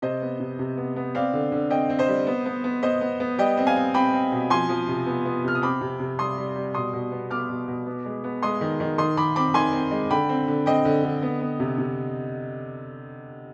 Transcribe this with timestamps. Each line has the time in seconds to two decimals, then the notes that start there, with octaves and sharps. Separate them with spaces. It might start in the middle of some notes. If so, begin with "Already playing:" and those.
0.02 C3 C5 D#5
0.22 B3
0.40 C3
0.59 C3
0.77 B3
0.96 B3
1.15 C4 D5 F5
1.33 D3
1.52 D3
1.70 C4 D#5 G5
1.90 C4
1.99 C5 D#5
2.08 G3
2.27 B3
2.46 B3
2.64 B3
2.83 B3 C5 D#5
3.01 B3
3.20 B3
3.38 G3 D#5 G5
3.57 C4
3.67 F5 G#5
3.76 C4
3.94 C4 G5 B5
4.13 C4
4.32 B2
4.50 F3 G#5 C6
4.69 F3
4.88 C3
5.06 B3
5.25 B3
5.44 C3 F6
5.55 D#6
5.62 C4 B5 D6
5.81 C3
6.00 C3
6.18 G3 C6 D#6
6.38 G3
6.56 G3
6.74 B2 C6 D#6
6.93 B2
7.12 B3
7.30 B3 D6 F6
7.49 B2
7.68 B2
7.86 B3
8.05 G#3
8.24 B3
8.42 G#3 C6 D#6
8.61 D#3
8.80 D#3
8.98 D#3 C6 D#6
9.17 D#3 B5 D6
9.36 C4 B5 D6
9.54 D#3 G#5 C6
9.73 C4
9.91 G#3
10.10 D3 G5 B5
10.29 C4
10.48 D3
10.66 C4 D#5 G5
10.85 D3
11.04 D3
11.22 B3
11.41 B3
11.60 C3
11.78 C3